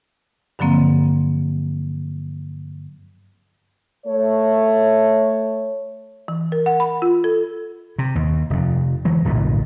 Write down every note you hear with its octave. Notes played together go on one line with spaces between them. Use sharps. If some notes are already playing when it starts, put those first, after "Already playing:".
G2 D3 F3 F#3 A#3 C4
A3 C#5
E3
A#4
F#5
B5
F4
A4
C3
D#2
F1 F2
E3 F#3 G#3
D1 B1 G2 A#2